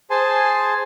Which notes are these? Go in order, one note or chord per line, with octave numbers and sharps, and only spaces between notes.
G#4 C5 G#5 A5 C6